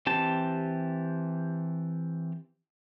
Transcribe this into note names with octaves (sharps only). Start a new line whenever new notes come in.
E3 C4 G4 A5